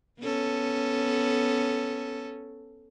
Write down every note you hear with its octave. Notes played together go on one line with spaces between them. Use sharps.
B3 C#4 A4